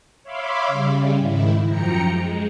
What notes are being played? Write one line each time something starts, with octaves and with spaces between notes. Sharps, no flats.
C#5 E5 F5 B5 C6 D6
C#3 G3
G#2 D#3 E4
F#2 F3 G5 A#5 C#7
G#3